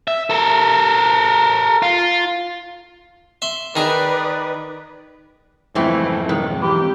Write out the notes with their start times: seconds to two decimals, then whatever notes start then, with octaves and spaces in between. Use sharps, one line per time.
0.08 E5
0.30 A4 A#4
1.82 F4
3.42 E5 C6
3.76 D#3 G#4 B4 D5 D#5
5.75 F2 G#2 C#3 E3 A3 C4 E4
6.29 B1 G2 D#3 G#3
6.62 E3 G4